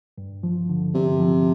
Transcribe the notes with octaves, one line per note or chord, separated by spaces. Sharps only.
G2
F3
D3
G2 C3
F3